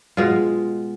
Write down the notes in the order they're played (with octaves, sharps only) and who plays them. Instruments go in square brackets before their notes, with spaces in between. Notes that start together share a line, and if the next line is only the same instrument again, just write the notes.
[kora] B2 G#3 F4